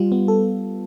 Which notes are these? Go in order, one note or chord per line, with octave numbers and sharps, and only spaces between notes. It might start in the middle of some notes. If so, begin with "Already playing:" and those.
Already playing: G3 F4
B3
A4